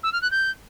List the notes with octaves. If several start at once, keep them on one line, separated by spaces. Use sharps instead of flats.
E6
F6
F#6
G6